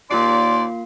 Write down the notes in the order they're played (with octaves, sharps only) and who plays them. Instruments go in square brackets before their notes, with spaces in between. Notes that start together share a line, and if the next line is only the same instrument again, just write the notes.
[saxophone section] D#2 D5 [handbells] A#3 F4 C7 [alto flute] C6